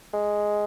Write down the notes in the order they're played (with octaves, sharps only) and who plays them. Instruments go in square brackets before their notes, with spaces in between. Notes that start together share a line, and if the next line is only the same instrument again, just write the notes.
[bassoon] G#3